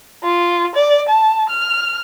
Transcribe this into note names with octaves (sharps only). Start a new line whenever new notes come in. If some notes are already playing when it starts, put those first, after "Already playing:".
F4
D5
A5
F6